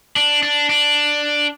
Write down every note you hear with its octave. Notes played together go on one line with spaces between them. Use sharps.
D4
D4
D4